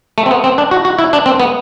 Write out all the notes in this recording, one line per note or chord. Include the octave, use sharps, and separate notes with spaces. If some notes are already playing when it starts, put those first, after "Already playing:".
A3
C4
B3
C4
D4
F#4
F#4
E4
D4
C4
B3